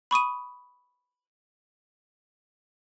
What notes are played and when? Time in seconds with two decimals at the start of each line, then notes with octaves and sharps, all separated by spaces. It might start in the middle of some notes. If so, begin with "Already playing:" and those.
0.11 B5 C#6 D#6 D#7